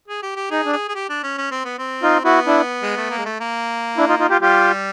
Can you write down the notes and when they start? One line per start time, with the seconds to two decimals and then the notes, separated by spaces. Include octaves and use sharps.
0.08 G#4
0.23 G4
0.36 G4
0.51 D#4 G#4
0.65 D4
0.73 G#4
0.88 G#4
0.95 G4
1.09 D4
1.23 C#4
1.38 C#4
1.51 C4
1.65 B3
1.79 C4
2.02 D#4 F4
2.24 B3 E4 F#4
2.46 D4 E4
2.83 G#3
2.97 A3
3.10 A#3
3.18 G#3
3.26 A3
3.41 A#3
3.97 D4 E4
4.08 D#4 F4
4.19 D#4 F4
4.30 F4 G4
4.41 G3 F4 G4